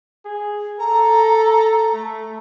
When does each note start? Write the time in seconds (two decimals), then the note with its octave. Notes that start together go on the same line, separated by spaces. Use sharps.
0.25 G#4
0.79 A4 A#5
1.93 A3